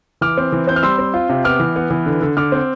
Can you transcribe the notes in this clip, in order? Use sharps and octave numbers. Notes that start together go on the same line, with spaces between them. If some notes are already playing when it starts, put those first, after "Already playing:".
E3 D6 F6
C4
E3
C4 G6
F6
G3 C6 E6
C4
F4
C3
B3 D6 F6
E3
B3
E3
D3
D3
D3 D6 F6
C4